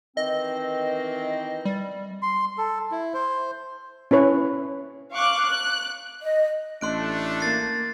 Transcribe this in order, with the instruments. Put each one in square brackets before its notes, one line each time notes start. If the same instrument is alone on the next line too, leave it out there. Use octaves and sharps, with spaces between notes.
[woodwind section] D#3 E3 C4 [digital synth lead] D#5
[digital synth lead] G3
[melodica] C6
A4
E4
C5
[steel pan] C#4 E4 B4 C#5
[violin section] F5 C#6 D6 F#6
F#6
[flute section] D#5
[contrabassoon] A1 [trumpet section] A3 D4 [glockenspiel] C6 F#6 D7
[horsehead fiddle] A#3 [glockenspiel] A6 C7